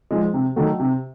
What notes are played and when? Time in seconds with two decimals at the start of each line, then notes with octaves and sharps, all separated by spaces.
0.11 F3 G#3
0.33 C3
0.56 D#3 F#3 A3
0.80 C3